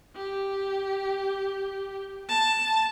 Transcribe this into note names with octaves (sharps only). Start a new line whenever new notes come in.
G4
A5